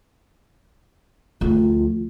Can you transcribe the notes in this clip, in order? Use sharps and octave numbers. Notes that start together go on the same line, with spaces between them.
D2 F3 F4